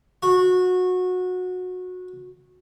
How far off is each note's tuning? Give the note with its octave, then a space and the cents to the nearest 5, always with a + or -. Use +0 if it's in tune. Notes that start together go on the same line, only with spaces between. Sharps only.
F#4 -20